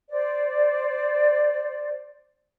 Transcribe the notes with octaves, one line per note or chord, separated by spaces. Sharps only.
C5 D5